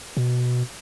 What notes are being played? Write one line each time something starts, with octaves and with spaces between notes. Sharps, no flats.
B2